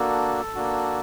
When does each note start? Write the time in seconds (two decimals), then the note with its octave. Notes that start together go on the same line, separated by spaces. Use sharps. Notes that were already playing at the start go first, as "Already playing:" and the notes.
Already playing: A#3 D4 F#4 A4
0.55 A#3 D4 F#4